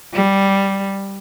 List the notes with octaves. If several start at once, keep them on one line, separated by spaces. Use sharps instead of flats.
G3